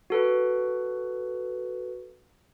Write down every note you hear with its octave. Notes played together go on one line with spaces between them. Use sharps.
F#4 A4 B4